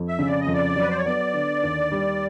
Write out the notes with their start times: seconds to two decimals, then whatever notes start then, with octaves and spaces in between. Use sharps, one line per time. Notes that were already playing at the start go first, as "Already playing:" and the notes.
Already playing: F2
0.08 E5
0.19 C#3
0.27 D5
0.40 D#5
0.47 F2
0.53 D5
0.76 F#3
0.82 B4
0.90 C5
0.98 C#5
1.05 B3 D5
1.34 D3
1.63 D#2
1.92 G3